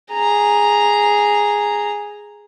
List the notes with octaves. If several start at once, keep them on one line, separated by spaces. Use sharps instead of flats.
G#4 A#5